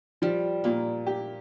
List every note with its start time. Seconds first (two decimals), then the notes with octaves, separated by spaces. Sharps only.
0.22 F3 G3
0.64 A#2 A#3
1.07 G4